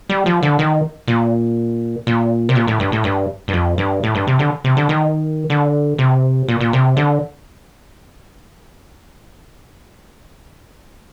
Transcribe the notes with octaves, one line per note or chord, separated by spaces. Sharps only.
G3
F3
D3
D#3
A#2
A#2
C3
A#2
A2
G2
A2
G2
G2
F2
G2
A2
G2
C3
D3
C3
D3
D#3
D3
C3
A#2
A#2
C3
D3